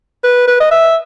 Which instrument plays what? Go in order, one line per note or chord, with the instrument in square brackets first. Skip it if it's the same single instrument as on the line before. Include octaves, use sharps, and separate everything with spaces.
[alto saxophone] B4
B4
D#5
E5